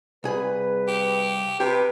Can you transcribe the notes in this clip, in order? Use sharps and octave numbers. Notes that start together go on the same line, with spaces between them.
C2 G#4 B4 B5
G4
C3 G4 B4